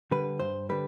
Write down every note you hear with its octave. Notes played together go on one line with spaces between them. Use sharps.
D3 G3 B4
G2 C5
D3 G3 B4